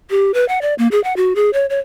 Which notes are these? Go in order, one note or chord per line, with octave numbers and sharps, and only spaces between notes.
G4
B4
F#5
D5
A#3
G#4
F#5
F#4
G#4
C#5
C#5